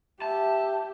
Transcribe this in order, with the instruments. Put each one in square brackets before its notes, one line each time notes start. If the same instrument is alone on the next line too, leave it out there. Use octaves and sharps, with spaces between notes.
[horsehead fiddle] G4 [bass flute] E5 [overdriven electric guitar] A5